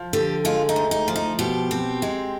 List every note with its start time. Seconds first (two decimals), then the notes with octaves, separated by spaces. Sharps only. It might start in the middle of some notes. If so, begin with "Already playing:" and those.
Already playing: F3
0.13 D3 G4
0.45 G#3 F4
0.69 D#4
0.76 D2
0.91 D#4
1.08 F3
1.16 D#4
1.39 B2 G4
1.71 C4
2.02 G#3